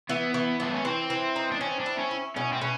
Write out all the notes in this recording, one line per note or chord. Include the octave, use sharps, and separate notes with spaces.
E3 B3
E3
E3 D4
C#4
E3 C4
E3
D#4
D4
C4 C#4
D4
E4
C#4
E4
B2 C#4
C4
B2 C#4